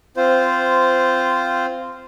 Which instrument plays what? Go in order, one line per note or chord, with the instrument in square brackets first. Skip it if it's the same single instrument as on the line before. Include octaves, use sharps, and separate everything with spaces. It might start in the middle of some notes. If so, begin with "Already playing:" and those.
[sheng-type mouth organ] C4 F4 C5